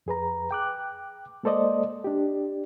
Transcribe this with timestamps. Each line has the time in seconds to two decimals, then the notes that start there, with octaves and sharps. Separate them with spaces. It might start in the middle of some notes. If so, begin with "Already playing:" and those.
0.06 F2 G#4 B4 A#5
0.51 G5 D6 F#6
1.43 G#3 A#3 A4 C5 D5 D#5
2.04 D4 G4